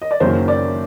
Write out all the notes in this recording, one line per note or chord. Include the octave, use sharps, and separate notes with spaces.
D#5
D5
F#1 F#2 D#3 F#3 A#3 C5
D5